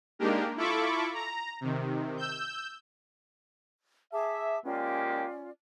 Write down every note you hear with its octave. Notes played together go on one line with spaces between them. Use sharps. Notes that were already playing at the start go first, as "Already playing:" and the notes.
G#3 A#3 D4 D#4 G4 A#4
E4 F4 A4 B5 C#6 D6
A#5
C3 D#3
E6 G6
G#4 E5 A5 D6
G#3 A#3 C#4 F4 G4 D5